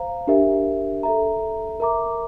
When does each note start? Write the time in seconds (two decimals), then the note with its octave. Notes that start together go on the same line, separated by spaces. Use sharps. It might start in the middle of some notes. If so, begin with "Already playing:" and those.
Already playing: C5 F5 A#5
0.27 D4 G4 A#4 E5
1.03 A4 E5 A#5
1.80 A#4 E5 A#5 D6